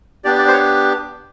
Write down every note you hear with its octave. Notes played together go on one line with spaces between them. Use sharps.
B3 D4 G4 D5
D5
C5
C#5